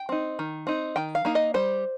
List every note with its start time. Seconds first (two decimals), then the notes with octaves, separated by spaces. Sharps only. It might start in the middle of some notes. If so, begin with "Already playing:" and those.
Already playing: G5
0.09 C4 D#4
0.39 D#3
0.67 C4 D#4
0.96 D#3 G5
1.15 F5
1.25 A#3 D#4
1.35 D#5
1.54 G3 C5